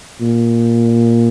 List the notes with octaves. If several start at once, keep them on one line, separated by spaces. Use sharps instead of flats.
A#2